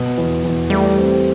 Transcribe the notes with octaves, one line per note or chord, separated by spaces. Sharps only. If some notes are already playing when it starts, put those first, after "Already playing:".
Already playing: B2
E2
E2
G3 A3
C4